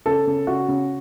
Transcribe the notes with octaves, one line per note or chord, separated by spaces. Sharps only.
C#3 A4
C#3
C#3 F#4
C#3